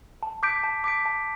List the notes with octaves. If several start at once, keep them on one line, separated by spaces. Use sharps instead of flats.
A5
D6 G6 B6 D7
A5
D6 G6 B6 D7
A5